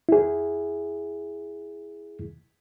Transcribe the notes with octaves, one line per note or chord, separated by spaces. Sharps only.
E4 G#4